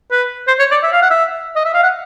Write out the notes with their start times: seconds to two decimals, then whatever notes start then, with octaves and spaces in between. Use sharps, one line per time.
0.11 B4
0.47 C5
0.59 C#5
0.71 D5
0.83 E5
0.92 F5
1.02 F#5
1.11 E5
1.56 D#5
1.65 E5
1.74 F5
1.83 F#5